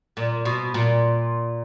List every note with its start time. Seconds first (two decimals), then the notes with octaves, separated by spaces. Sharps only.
0.17 A#2
0.45 B2
0.74 A#2